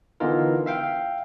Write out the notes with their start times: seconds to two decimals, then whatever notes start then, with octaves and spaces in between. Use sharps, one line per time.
0.20 D3 E3 B3 D#4 F4 A#4
0.66 E5 F5 G5